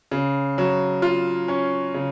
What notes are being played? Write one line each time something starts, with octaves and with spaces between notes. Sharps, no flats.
C#3
F#3
F4
C#4
C#3